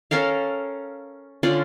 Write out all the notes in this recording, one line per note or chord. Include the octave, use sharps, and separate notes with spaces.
C#4 A4 A#4 F5
D3 C#4 F4 D5